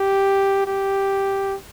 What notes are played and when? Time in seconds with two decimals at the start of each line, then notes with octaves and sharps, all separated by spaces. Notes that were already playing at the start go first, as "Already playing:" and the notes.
Already playing: G4
0.66 G4